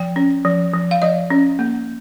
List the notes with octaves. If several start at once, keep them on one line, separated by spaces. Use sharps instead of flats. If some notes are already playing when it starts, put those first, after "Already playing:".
Already playing: F3 G5
C#4
F3
F3
F5
F3 D#5
C#4
A#3